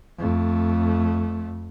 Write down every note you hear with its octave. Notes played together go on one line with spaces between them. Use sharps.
F2 A3